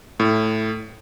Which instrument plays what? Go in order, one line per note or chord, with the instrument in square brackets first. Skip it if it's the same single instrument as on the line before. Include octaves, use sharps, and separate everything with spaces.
[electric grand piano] A2